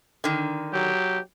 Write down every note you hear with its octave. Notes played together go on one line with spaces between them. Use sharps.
D3 D#3
F#3 G4